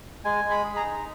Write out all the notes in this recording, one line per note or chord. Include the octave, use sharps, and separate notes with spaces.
G#3 G#5
G#3
B5
G#4
A#5
D#4